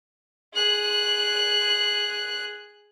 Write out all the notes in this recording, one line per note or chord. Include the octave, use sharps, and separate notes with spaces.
G#4 F#6